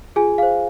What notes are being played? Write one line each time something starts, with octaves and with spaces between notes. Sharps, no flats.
F4 G#4 G#5
G#4 C5 F5